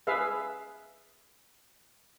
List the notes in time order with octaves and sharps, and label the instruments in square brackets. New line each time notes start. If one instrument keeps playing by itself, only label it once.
[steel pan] G#4 B4 E5 F5